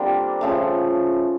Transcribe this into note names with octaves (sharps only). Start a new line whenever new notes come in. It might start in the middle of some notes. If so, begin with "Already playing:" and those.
Already playing: D3 G3 A#3 C4 D4 F4 A#4
C#3 F3 A3